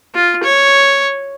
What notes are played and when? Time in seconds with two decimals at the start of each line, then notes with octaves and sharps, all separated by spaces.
0.15 F4
0.44 C#5